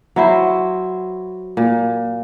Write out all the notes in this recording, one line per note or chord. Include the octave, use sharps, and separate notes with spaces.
F#3 E4 C5
A#2